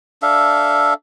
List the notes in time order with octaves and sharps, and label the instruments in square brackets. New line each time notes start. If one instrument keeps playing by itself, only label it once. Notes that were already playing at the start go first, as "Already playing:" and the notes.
[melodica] D4 A4 E5 F5